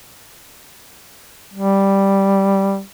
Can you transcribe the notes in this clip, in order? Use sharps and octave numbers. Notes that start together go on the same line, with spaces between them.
G3